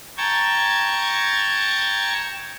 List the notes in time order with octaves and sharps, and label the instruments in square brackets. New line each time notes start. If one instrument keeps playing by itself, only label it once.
[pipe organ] G5 A5 A#5 C#6 G#6